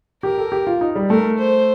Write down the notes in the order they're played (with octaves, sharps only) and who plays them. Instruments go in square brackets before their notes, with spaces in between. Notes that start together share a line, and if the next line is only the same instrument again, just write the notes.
[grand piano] G4 [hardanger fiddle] A#4
[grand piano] A4
G4
F4
D#4
G3
[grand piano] A3 [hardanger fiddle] A#4
[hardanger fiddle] C5